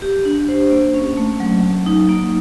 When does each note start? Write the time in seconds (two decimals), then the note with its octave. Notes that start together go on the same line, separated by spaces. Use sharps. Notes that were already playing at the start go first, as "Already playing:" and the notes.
0.02 G4
0.25 D4
0.48 C5
0.71 A#3
0.94 C#4
1.17 A3
1.40 F#3
1.63 F#3
1.86 D#4
2.09 A#3